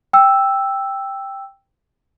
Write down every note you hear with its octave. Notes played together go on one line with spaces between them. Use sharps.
G5 E6